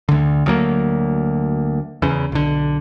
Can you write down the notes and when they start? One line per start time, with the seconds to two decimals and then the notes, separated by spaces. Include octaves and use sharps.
0.09 D2 D3
0.46 D2 F#3 A#3
2.02 E2 C#3
2.32 B1 D3